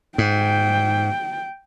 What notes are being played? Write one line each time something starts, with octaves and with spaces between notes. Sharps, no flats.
G#2 G5